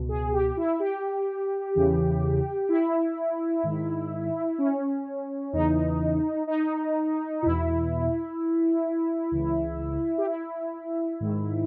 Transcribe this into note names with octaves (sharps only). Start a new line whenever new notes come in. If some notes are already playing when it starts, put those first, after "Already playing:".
Already playing: C#2 B2
G#4
G4
E4
G4
E2 C#3 E3
E4
G#2 D#3
C#4
E2 C#3 E3 D#4
D#4
E2 B2 E4
C#2 C#3 E3
G4
E4
G#2 D#3